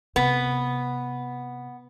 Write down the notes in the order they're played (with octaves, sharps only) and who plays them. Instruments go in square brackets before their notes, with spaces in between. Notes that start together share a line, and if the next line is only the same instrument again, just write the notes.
[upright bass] C3 [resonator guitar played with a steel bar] B3